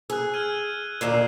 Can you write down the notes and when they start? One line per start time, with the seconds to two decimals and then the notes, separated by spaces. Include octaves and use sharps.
0.10 G#4 E6 F#6
0.34 F6 G#6 D#7
1.01 D#2 A#2 D3 E6 C7 E7